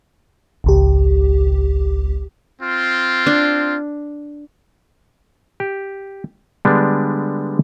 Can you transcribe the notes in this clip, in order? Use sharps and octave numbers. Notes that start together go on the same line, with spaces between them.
G#1 C#2 G4
C4 F4
D4
G4
D3 G3 G#3 B3 D4